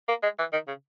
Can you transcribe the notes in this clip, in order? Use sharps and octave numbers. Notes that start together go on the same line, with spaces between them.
A#3
G#3
E3
D#3
C#3